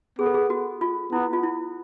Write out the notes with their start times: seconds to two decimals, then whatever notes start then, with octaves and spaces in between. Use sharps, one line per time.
0.19 B3 G#4
0.26 A4
0.34 G#4
0.50 F#4
0.81 F4
1.12 B3 E4
1.33 F4
1.43 E4